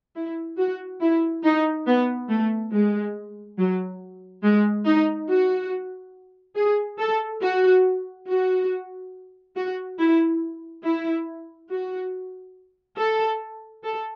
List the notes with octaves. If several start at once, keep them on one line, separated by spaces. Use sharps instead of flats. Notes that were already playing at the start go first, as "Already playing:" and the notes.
E4
F#4
E4
D#4
B3
A3
G#3
F#3
G#3
D#4
F#4
G#4
A4
F#4
F#4
F#4
E4
E4
F#4
A4
A4